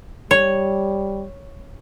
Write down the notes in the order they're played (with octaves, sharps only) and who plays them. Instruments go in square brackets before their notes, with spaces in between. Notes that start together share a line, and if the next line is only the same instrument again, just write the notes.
[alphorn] G3 [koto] C#5